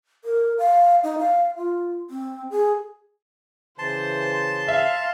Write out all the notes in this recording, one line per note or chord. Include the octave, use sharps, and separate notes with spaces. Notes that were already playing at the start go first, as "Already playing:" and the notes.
A#4
F5
D#4
F5
F4
C4
G#4
C#3 E3 C5 A5 C6
E5 F5